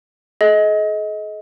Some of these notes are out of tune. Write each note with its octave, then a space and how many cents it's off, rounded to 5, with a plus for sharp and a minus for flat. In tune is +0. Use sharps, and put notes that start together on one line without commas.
G#4 +45 D#5 +20